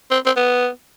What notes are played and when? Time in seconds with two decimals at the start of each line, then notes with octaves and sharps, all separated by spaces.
0.11 C4
0.26 C4
0.37 B3